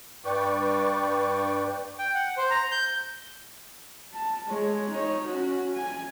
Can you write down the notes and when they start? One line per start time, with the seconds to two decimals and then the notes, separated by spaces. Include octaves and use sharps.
0.25 G2 B4 D5 G5 C#6 D6
1.98 G5
2.14 F#5
2.37 C5
2.50 A#5
2.72 G6
4.13 A5
4.48 G#3 C#5
4.90 D#4 C#5
5.27 C#4 F#4
5.74 G#5